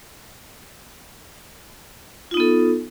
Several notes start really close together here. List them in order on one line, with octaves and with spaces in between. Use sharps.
F4 D#4 B3 A4